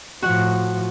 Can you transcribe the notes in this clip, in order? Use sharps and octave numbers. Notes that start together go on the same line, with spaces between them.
A2 F3 F#4 F#5